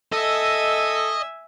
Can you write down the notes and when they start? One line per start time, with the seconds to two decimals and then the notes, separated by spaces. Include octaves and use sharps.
0.12 A4 D#5 E5 G#5